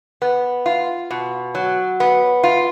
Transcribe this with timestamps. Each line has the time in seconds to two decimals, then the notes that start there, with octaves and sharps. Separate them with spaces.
0.22 B3
0.66 F4
1.11 B2
1.55 F#3
2.00 B3
2.43 F4